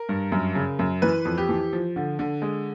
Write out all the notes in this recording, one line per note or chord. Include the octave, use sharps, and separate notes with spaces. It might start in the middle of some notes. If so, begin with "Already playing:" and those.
Already playing: A#4
G2
F#2
C#3
F#2
E3 B4
F2
G4
E3
F3
D3
D3
G#3